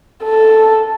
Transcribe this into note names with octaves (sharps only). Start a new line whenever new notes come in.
A4